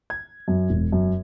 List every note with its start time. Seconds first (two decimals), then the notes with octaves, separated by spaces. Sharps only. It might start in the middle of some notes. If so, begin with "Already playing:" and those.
0.10 G#6
0.48 F#2
0.70 E1
0.92 F#2